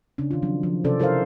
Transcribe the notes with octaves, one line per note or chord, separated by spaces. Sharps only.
C#3 C#4 D4
D#3 F4
F3 F#3 C4 D4
F3
C3 C#4 A4 C5 D5
E4 A4 A#4 C5 F5